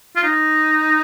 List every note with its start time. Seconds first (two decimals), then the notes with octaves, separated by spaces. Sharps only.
0.16 F4
0.23 D#4